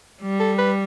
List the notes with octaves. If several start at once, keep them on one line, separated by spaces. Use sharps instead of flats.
G3
A4
B4